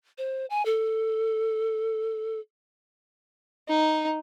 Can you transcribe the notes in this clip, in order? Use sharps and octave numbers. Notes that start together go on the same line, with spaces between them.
C5
G#5
A4
D#4